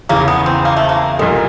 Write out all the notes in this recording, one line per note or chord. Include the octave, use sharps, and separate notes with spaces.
E2 C#3 E3 A#3
B3
C4
A#3
A3
A#3
C2 A#2 G3 G#3 A#3